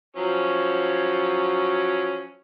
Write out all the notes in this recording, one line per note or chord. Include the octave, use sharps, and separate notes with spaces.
F3 F#3 C#4